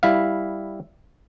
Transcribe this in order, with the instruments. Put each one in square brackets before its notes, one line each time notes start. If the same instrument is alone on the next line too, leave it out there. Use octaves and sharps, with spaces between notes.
[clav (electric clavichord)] G3 E4 E5 F5